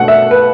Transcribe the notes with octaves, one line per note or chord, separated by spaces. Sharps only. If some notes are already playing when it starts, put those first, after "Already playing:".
Already playing: B2 A3 D4 F#5
E5
B4